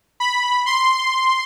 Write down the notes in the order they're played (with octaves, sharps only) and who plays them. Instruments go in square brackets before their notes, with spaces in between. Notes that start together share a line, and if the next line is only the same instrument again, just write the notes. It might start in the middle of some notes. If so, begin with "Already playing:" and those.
[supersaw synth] B5
C6